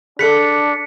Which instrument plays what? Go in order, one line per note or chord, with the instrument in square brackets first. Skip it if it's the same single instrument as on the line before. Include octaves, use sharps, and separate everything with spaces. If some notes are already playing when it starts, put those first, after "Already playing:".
[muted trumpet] D4 [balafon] G#4 A4 [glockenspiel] B6 C#7